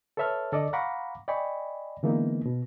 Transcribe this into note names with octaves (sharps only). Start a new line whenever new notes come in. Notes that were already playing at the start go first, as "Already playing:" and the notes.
A4 B4 C#5 E5 A5 F6
D3 A4 D5 D#5 D6
F5 F#5 A#5 B5 C#6 D6
D5 D#5 G5 G#5 B5 C#6
D3 E3 G#3 A#3 B3 D#4
B2